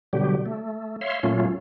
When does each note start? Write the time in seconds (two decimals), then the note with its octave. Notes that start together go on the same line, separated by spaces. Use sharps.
0.13 B2 D3 F#3 G3 G4
0.46 A3
1.01 C#5 E5 F5 C6
1.23 A#2 F#3 A3 C#4 F4